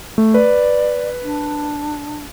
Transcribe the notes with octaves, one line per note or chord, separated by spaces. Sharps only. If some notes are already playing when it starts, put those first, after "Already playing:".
A3
B4 D5
D4